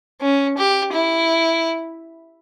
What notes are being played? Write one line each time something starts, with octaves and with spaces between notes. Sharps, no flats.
C#4
G4
E4